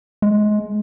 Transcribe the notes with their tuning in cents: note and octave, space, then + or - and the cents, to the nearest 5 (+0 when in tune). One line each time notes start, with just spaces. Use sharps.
G#3 +20